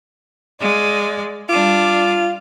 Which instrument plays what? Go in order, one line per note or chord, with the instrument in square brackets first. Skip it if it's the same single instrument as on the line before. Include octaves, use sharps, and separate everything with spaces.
[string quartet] G#3 D5 F5
[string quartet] G3 D4 D6 [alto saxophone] F4